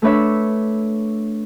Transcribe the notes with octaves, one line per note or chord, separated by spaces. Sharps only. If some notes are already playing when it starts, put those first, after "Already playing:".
A3 D4 B4 C#5 E5